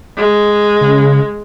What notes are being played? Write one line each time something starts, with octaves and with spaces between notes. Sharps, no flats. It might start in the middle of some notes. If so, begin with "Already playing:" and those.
G#3
C#3